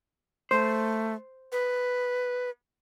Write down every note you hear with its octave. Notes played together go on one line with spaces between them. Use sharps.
A3 C5
B4